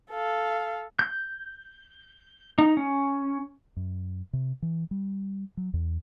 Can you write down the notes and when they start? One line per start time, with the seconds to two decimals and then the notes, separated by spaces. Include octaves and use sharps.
0.10 A4 F5
0.99 G6
2.58 D#4
2.77 C#4
3.76 F#2
4.33 C3
4.62 E3
4.91 G3
5.57 F#3
5.74 E2